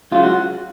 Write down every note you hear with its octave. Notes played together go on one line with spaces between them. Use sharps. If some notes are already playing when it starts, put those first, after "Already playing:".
C#2 C#3 F#3 F4
F#4